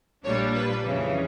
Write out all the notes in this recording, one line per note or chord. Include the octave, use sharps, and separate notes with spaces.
A#1 A#2 G3 A#3 D4 C#5
B4
F2 C#3 E3